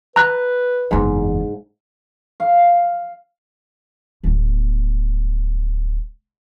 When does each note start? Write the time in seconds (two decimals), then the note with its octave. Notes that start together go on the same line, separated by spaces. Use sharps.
0.16 B4 A#5 F#6
0.91 F#1 E2 G#2
2.40 F5
4.24 D1 B3